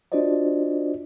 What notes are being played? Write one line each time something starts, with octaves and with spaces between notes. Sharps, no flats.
D4 F4 F#4 C5 D5 D#5